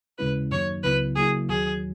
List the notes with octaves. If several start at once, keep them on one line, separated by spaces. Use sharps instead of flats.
D#2 C#3 G#3 C#4 E4 B4
F#2 D#3 F#3 A#3 D#4 C#5
C#2 C#3 F#3 B3 E4 B4
C#3 F#3 A#3 E4 G#4
D#2 D#3 F#3 G#4